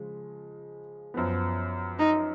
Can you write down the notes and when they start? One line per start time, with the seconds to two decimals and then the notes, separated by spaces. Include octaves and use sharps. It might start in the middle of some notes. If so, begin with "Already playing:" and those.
Already playing: C#3 F3 G#3
1.14 F#2 F3 B3
1.99 D#4